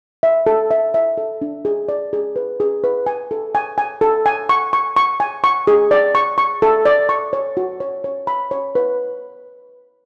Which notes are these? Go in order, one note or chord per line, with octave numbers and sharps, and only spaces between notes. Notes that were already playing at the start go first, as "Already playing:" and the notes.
E5
A4
E5
E5
A4
D4
G#4
D5
G#4
B4
G#4
B4
G#5
A4
G#5
G#5
A4
G#5
C#6
C#6
C#6
G#5
C#6
G#4
D5
C#6
C#6
A4
D5
C#6
C#5
F#4
C#5
C#5
B5
C#5
B4